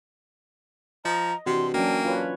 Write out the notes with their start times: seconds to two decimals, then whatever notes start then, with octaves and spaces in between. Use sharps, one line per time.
1.05 F3 D#5 A#5
1.46 C3 E3 D4 F#4 C6
1.74 F#3 A#3 C#4 D4 G5
2.04 F4 B4 C#5